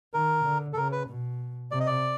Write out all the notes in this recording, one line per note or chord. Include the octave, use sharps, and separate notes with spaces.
D#3 A#4
D3
A4
C#3 A#4
B4
B2
C3 D5
D#5
D5